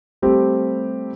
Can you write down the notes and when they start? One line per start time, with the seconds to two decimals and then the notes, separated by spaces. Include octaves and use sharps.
0.22 G3 A3 C4 G4